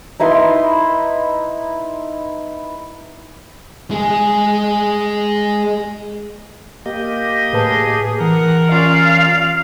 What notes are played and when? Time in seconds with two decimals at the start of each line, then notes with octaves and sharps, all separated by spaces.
0.20 D#4 E4 B4 C6
3.91 G#3 G#4
6.86 A#3 G4 D#5
7.53 A2 G#4 B4 A5
8.21 E3 A#4 F#5
8.72 C#4 F4 D5 F5